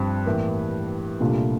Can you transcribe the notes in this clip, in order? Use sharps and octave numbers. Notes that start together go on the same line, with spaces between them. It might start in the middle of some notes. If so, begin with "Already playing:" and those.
Already playing: G2 F3 C4
A2 E3 A#3
C2 A#2 A3 D4 F4